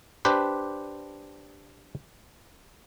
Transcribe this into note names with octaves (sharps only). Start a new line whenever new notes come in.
D4 G4 B4 C5